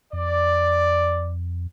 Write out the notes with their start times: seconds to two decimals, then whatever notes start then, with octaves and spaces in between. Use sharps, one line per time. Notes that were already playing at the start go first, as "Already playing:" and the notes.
0.13 F2 D5